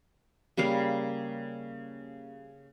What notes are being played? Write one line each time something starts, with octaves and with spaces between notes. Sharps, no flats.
C#3 G3 A#3 F5